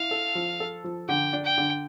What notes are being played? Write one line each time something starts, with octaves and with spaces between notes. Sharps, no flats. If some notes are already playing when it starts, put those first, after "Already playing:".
Already playing: E4 F5
A4
F3
A4
F3
D3 G5
D4
G5
D3